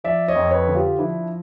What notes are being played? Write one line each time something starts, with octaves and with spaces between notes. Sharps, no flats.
F3 D5 E5
C#5 D#5
F2
B4 C#5
D3
F4 G4
F3 D4 E4